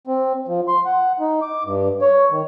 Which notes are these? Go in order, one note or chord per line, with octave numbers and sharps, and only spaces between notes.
C4
F3
C6
F#5
D#4
D6
G2
C#5
D#3